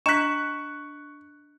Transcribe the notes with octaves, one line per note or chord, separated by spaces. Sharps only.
D4 D#5 A#5 C#6 F#6 B6 E7